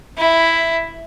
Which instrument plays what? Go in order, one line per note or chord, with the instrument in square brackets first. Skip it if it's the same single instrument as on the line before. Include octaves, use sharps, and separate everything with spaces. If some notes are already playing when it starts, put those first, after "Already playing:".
[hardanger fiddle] E4